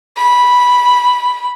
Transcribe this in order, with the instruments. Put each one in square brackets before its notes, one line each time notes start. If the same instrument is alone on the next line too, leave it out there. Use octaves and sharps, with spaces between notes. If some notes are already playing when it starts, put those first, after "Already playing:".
[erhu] B5